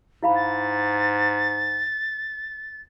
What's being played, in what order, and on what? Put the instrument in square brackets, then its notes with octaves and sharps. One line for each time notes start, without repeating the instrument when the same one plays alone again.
[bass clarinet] G#2 [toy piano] E4 F5 B5
[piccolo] A6